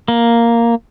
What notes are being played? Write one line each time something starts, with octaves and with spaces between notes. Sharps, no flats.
A#3